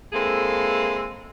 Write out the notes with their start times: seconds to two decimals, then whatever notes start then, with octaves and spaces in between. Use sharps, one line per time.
0.13 G#3 A#3 C4 E4 G#4 A4